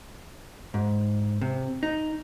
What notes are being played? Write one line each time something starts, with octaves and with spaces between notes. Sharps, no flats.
G#2
C3
D#4